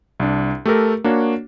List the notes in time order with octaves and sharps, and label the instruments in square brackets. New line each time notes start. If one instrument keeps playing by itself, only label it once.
[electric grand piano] C2 D4
A3 G4 A4 A#4
A#3 D4 F#4 C#5